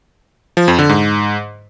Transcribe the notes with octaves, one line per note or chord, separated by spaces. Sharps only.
F3
F2
D3
G#2